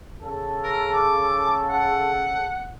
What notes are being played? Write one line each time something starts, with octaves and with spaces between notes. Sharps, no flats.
C#3 A4
A#4
D6
F#5